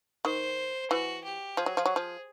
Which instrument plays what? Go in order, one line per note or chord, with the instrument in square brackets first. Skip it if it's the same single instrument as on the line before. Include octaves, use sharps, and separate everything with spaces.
[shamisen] D#3 [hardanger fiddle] C5
[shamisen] E3 [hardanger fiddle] F#4
[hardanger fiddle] G4
[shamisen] F3 [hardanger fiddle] G#4
[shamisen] F#3
F3
F#3
F3